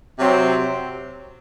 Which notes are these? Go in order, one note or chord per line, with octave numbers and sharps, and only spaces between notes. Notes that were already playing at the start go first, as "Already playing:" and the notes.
C3 F#3 C4